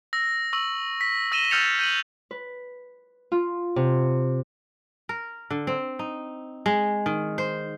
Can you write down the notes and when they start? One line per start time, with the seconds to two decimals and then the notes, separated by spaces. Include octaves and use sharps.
0.13 E6 A#6
0.53 C#6 E6 F#7
1.01 B6
1.32 E6 A#6 D#7 E7 G7
1.51 E6 F6 G6 A6 C#7 F7
1.79 G6 D#7 F#7
2.31 B4
3.32 F4
3.76 C3
5.09 A#4
5.50 D3
5.67 C4
5.99 D#4
6.66 G#3
7.06 D#3
7.38 C5